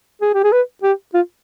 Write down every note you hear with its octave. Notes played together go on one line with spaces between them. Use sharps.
G#4
G4
G#4
B4
G4
F4